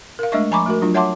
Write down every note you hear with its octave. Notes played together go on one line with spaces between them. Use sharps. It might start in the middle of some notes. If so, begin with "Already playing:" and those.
A#4 F5
G#3 A3 D4 D#5 E5 C#6
F3 G#5 A#5 B5 C#6 D6
A3 F#4 A#4
F#3 D4 F4
C#5 E5 F#5 A5 C6 D6